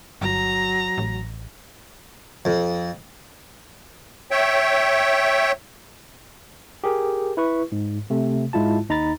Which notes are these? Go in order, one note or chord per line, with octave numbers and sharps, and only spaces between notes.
G1 F#3 A#5
A1
F2
C#5 E5 G5
G4 G#4 A#4
E4 B4 C#6
G#2
C3 A3
G#2 G#3 E4 F4 A5
D#2 D#4 A#5 B5 A6